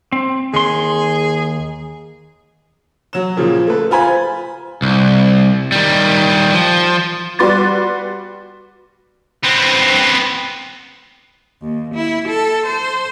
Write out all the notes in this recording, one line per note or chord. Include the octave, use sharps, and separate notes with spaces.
C4
D#2 G#4 C6
F#3 E7
A#2 C#3 F3
A3 B4
F4 C5 G#5 B5 G#6
C2
D#3 G3
F3
G3 F#4 B4 C6 D6 A6
B3 C4
D#2
E4
A4
C5